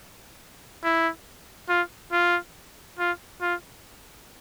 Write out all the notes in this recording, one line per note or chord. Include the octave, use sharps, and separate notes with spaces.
E4
F4
F4
F4
F4